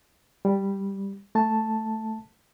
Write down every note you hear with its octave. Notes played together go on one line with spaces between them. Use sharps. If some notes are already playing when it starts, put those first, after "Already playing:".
G3
A3 A5